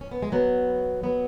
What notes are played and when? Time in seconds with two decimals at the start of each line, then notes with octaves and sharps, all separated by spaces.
0.01 C#4
0.11 B3
0.23 G#3
0.32 F#3 B3
1.04 F#3 B3